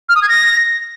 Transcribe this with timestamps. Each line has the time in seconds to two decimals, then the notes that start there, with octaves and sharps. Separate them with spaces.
0.09 F6
0.16 D#6
0.22 G#6
0.29 A#6